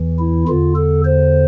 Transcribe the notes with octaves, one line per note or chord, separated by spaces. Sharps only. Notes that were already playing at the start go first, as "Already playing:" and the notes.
Already playing: E2 E3
E4
E2 D3 F4
A4
C5